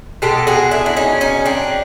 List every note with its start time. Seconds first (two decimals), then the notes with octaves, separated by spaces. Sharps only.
0.22 B2 G#3 G4 A4
0.47 F#4 G#4
0.71 D4 E4
0.86 D4
0.97 C#4 D#4
1.21 C#4 D#4
1.45 C4 D4